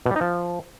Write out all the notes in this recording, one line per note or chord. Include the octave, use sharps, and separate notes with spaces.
B2
G3
D#4
F3